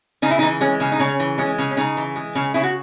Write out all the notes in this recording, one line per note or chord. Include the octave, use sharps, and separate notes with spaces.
C#3 D#4
E4
D#4
E3
G#3 C#4
C#3
D#4
C#3 C#4
E3
G#3 C#4
C#3
C#4
C#3 D#4
E3
G#3
C#3
C#3 E4
F#4